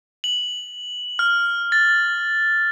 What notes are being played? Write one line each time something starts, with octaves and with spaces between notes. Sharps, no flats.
F#7
F6
A6